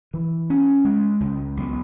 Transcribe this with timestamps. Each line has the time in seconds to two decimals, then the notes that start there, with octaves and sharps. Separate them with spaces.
0.14 E3
0.50 C#4
0.85 G#3
1.20 C#2
1.57 B1